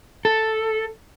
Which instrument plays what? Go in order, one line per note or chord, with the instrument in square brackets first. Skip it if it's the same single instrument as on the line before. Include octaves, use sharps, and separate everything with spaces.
[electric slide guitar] A4